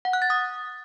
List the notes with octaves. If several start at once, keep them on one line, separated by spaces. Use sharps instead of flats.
F#5
F#6
A6
D#6